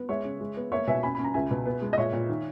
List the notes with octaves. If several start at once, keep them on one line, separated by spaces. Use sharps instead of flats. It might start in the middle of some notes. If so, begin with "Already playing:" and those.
Already playing: B3
G#3 C#5 E5
C#3
G#3
B3
A#3 C#5 E5
B2 E5 G#5
C#4 G#5 B5
C#4 B5
A#5
C#2 E5 G#5
B2
B3
G#3
D#5
A#2 C#5 E5
A#2
D#3